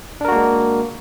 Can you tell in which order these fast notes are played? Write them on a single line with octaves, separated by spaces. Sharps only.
D4 A#4 F#4 A#3 G#3